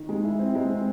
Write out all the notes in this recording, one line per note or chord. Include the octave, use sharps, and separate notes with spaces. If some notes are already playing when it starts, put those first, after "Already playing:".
Already playing: D#3
G#3
E4
C4
G#3
C4